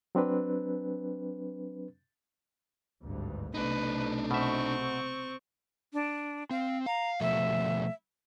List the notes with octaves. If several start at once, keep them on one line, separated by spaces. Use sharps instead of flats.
F#3 C4 D4 B4
G#1 D2 G2
B1 C3 A3 D4 D#4 B4
B2 C4 E5 C#6
D4
C4 F5
F5 A#5
B2 F3 A3 E5